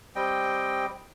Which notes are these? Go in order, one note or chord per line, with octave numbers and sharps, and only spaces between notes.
G3 C4 D#5 G5